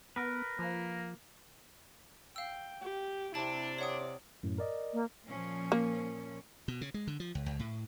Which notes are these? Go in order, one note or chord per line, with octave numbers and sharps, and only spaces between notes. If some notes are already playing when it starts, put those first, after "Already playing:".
B3 A#4 B4
F3 A#3
F5 G5 E6
G4
C3 D4 E4 A5
C#5 D5 F#5 D#6
F#2 A2
A#4 D5 D#5
A#3
A#2 F3 C#4
A#3
B2
C#3
G#3
D3
F3
C#2
C#2
A2